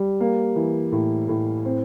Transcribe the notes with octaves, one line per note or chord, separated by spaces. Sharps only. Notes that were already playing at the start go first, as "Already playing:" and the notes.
Already playing: G3
A#3
E3
A2
A2
C4